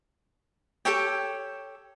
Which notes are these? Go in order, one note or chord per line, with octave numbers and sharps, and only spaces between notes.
G4 A4 C#5 G5